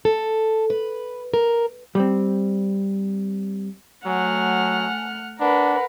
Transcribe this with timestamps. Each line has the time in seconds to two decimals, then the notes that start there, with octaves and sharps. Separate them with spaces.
0.05 A4
0.70 B4
1.34 A#4
1.95 G3 C4
4.06 F#3 A3 F#5 G#5 F6
5.40 D4 A#4 B4 F#5